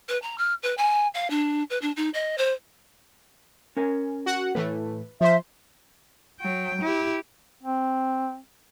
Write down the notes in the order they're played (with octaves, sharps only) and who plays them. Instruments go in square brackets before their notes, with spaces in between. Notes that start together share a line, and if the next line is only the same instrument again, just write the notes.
[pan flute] B4
A#5
F6
B4
G#5
F5
D4
B4
D4
D#4
D#5
C5
[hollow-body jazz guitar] C#4 A#4 G#5
[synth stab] F#4 F#5
[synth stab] A2 E3 A3 [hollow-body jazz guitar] B4
[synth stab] F3 C5 [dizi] E5
[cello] F#3 G5
E4 G4
[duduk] C4